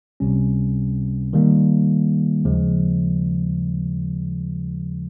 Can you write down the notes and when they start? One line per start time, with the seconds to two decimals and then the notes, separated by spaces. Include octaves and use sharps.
0.20 C#2 C3 G3 C#4
1.33 D#3 G3 A#3
2.45 D#2 C#3 F3 G#3